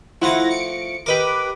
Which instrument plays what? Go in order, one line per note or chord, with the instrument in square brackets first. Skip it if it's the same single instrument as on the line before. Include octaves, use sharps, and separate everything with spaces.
[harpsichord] F3 A3 F4 [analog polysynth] E4 F#5 A#6
[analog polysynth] C#7 D7
[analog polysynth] G4 B4 D6 [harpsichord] A#4 D#5 B5